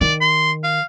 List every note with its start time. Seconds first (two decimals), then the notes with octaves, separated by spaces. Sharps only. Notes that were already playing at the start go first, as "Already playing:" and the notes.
0.01 D#3 D5
0.21 C6
0.64 F5